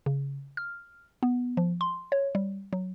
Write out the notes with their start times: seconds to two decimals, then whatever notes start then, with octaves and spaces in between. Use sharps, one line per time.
0.06 C#3
0.57 F6
1.23 B3
1.57 F3
1.81 C6
2.12 C#5
2.35 G3
2.73 F#3